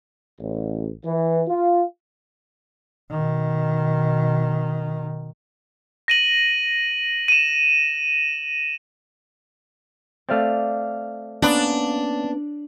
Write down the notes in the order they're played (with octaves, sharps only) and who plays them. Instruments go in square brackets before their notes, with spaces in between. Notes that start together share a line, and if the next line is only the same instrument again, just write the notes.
[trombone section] A1
E3
F4
[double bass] B2 D#3
[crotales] A#6 D#7 F#7
D#7 E7
[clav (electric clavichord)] A3 C4 [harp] D5 F5
[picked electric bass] A#3 B3 C#4 [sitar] D4